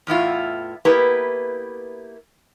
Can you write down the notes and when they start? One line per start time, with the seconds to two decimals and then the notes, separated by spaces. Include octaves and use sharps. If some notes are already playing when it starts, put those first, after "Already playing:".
0.07 E2 A2 E4 F4
0.85 A#3 B3 E4 G4 B4